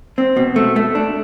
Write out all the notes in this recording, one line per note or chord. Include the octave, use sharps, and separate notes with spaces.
C4
B2
A3
A3
D4